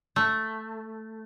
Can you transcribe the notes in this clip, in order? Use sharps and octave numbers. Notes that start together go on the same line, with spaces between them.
A3